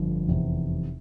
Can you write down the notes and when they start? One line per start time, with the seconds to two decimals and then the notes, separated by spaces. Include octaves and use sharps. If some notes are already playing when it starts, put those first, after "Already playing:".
Already playing: G1 F2 D3 F3
0.28 F1 E2 C3